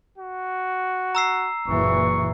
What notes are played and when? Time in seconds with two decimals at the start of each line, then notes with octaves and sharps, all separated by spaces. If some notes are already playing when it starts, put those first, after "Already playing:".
0.18 F#4
1.15 A#5 E6 C7
1.68 F#1 A#2 E3 C#6